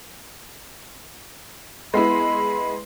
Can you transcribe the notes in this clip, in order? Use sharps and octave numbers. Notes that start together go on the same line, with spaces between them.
G#3 B3 E4 B5